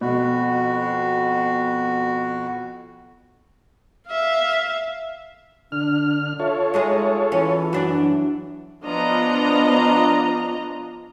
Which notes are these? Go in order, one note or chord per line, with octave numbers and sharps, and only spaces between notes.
F2 B2 F#4
E5 F5
D3 D4 F6
F4 A4 C#5 E5
G#3 D#4 G#4
E3 C#4
F#2 F#3 D4
F3 B3 D4 F4 D#5 A#5